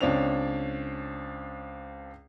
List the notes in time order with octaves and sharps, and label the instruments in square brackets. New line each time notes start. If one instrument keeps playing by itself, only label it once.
[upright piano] C#2 C4 D4 C#5 F7